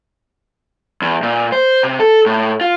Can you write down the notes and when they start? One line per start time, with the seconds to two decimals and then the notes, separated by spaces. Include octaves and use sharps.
1.02 E2
1.23 A#2
1.52 C5
1.83 C3
2.00 A4
2.26 A2
2.61 F4